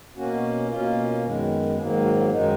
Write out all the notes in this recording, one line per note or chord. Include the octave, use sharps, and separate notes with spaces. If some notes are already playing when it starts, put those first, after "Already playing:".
B2 A#3 C#4 F#4
B2 A#3 C#4 F4
F#2 D#3 G#3 B3
G#2 D#3 F#3 A#3 G#4
F#4
F#4
F4
F#2 D#3 G#3 D#4